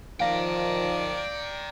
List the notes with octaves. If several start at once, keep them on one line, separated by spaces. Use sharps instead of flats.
D#3 F3 D5 F5 G5 A#5